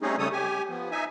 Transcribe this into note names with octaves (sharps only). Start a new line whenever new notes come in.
G3 A3 C4 C#4 D#4 G#4
C#3 G3 A3 A4 C#5 D#6
G4 G#5
F3 B3
D#4 E5 G#5